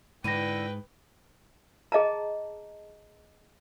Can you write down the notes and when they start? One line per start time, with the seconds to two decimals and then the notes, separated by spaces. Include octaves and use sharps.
0.24 G#2 D3 E4 B4 G5 A#6 D#7
1.92 G#4 D#5 A5 A#5